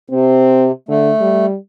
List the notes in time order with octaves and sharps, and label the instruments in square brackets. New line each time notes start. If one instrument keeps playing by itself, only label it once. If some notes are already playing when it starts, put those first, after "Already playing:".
[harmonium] C3 [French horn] C4
[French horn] D3 [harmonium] A3
[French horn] G3